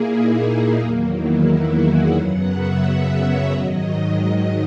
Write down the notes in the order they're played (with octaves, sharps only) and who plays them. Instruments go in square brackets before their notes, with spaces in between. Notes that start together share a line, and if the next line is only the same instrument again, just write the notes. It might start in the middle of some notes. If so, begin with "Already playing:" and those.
Already playing: [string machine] A#2 A#3 E4 G#4
D#4
E2 D#3 F#3 A#3
E4
F#4
G#4
F#2 C#3 F#3 B3 F#5
E5
C#5
G#2 D#3 F#3 D#5